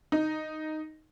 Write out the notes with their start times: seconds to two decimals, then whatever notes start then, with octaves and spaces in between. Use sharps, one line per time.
0.12 D#4